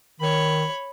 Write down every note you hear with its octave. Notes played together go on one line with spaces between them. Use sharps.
D#3 C#5 B5